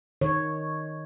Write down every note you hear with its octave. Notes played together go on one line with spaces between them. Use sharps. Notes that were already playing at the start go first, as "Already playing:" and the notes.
D#3 C#5